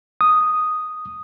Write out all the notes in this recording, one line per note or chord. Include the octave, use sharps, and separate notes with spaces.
D#6